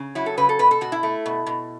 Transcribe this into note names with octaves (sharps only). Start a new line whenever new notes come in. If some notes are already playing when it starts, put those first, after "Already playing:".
Already playing: C#3
F#3 E4
A4
C#3 B4
A4
B2 B4
A4
B2 F#4
E4
A3
B2
B2